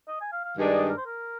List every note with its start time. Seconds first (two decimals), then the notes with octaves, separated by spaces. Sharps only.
0.08 D#5
0.21 G#5
0.32 F5
0.44 F5
0.56 G2 D#3 G#3 D4
0.73 D#5
0.89 A#4
0.97 C5
1.06 A#4